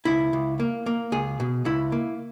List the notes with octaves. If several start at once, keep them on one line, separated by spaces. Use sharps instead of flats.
C#2 E4
C#2
A#3
A#3
C#2 G#4
B2
C#2 E4
A#3